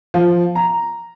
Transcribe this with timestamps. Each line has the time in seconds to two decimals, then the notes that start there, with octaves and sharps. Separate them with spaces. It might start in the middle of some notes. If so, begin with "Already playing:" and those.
0.14 F3
0.55 A#5